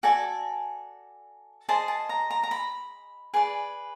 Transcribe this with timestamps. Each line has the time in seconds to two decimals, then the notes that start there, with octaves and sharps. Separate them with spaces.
0.03 F#4 A4 D5 G#5
1.69 G#4 C5 D#5 A5
1.88 A5
2.09 A#5
2.30 A#5
2.43 A#5
2.51 B5
3.34 G#4 B4 D5